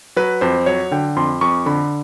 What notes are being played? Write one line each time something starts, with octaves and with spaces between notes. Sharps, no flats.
F#3 B4
F2 C5
F#3 C#5
D3 G5
F2 C6
F2 C#6
D3 B5